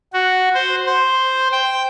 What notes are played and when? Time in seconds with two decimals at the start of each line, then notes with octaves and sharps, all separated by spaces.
0.13 F#4
0.54 C5
0.86 C5
1.52 G5